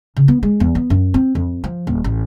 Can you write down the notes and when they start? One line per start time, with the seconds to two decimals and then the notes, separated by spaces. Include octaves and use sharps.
0.17 C#3
0.28 B3
0.43 G#3
0.60 E2
0.75 B3
0.90 F#2
1.14 C4
1.35 F2
1.64 F3
1.87 D#1
2.04 A1